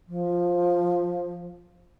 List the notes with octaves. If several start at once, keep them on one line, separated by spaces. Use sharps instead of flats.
F3